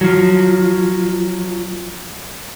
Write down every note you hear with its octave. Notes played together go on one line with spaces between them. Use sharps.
F3 F#3